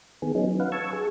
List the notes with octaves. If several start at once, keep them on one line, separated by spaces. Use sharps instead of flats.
D#3 B3 G#4
F#3 B3 C#4 D#4
F#3
B4 F5 F#5
A5 C#6 E6 G#6
G#4